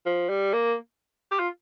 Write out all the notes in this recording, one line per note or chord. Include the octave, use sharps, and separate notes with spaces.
F3
G3
A#3
G4
F4